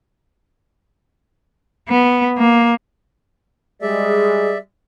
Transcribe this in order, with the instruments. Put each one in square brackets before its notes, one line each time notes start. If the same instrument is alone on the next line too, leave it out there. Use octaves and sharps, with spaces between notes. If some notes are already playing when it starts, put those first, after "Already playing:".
[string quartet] B3
A#3
[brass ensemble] G3 G#3 [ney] G#4 [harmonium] D5 E5